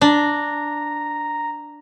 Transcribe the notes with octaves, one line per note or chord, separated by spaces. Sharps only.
D4 A#5